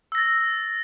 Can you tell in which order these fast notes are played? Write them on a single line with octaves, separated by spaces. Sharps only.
E6 A#6 A6